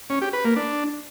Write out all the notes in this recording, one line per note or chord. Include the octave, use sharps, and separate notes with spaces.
C#4
G4
B4
A#3
D4